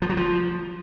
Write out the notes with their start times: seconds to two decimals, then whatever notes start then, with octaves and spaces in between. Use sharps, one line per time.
0.02 F3
0.09 F#3
0.17 F3